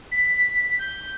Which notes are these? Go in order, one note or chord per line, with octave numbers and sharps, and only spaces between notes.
B6
G6